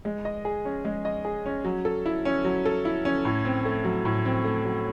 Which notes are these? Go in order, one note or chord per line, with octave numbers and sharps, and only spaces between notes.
G#3
D#5
G#4
C#4
G#3
D#5
G#4
C#4
F#3
A4
E4
C#4
F#3
A4
E4
C#4
A2
C4
A3
F#3
A2
C4
A3
F#3